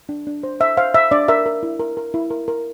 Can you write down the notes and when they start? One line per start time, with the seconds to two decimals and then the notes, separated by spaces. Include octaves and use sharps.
0.09 D4
0.27 D4
0.43 C5
0.60 C5 E5
0.77 C5 F5
0.94 C5 E5
1.11 D4 D5
1.28 A#4 E5
1.46 A#4
1.63 E4
1.80 A#4
1.97 A#4
2.14 E4
2.30 A#4
2.48 A#4